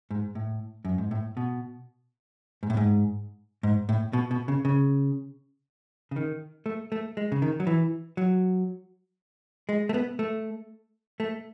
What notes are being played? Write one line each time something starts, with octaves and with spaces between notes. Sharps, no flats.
G#2
A2
F#2
G#2
A2
B2
G#2
A2
G#2
G#2
A2
B2
B2
C#3
C#3
C#3
D#3
A3
A3
G#3
C#3
D#3
F#3
E3
F#3
G#3
A3
B3
A3
A3